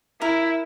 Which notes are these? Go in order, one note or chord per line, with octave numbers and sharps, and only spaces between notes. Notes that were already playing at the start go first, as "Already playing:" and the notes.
E4 A#4